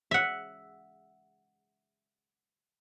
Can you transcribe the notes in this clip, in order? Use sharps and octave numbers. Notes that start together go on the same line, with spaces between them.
E5 F#5